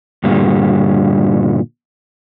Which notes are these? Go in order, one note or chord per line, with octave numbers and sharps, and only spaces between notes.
G2 A#2 D3 G3